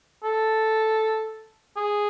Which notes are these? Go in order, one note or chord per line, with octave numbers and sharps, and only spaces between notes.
A4
G#4